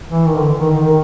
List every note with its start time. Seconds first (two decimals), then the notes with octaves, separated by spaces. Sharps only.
0.09 E3
0.27 D#3
0.38 D3
0.61 D#3
0.71 D#3
0.82 D#3